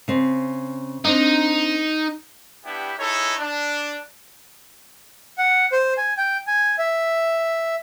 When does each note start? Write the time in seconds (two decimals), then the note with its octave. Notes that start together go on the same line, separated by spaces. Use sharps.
0.08 C#3 C4
1.05 C4 D4 D#4
2.65 B3 D4 E4 G4
2.98 D#4 E4 G#4 A4 C#5
3.39 D4
5.38 F#5
5.72 C5
5.98 G#5
6.17 G5
6.47 G#5
6.78 E5